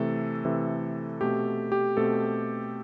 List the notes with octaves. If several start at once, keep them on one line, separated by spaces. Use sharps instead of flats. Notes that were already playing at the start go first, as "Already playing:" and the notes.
Already playing: C3 E3 A3 A4
C3 E3 A3
B2 A3 C4 G4
G4
B2 A3 C4 A4